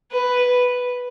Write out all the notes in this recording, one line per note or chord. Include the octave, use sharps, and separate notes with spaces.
B4